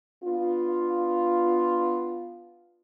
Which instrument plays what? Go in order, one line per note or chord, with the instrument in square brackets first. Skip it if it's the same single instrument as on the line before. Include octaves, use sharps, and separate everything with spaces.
[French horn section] B3 D4 F4